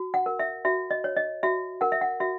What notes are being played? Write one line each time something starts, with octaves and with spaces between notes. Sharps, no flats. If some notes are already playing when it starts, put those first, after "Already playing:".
Already playing: F#4
F#5
A#4
E5
F#4 E5
D#5
C#5
D#5
F#4 E5
A#4 F#5
E5
F#5
F#4 E5